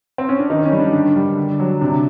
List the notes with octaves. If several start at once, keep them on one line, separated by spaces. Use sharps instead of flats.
C4
C#4
D4
D#3 D#4
C#4
G3
D4
D3 D4
G3
D3
F#3
C3 D4